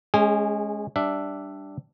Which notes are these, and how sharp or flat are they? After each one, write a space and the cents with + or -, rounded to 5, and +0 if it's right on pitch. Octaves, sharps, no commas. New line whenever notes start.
G#3 +15 C#4 -5 G#4 -30
G3 +0 D4 +0 E5 +10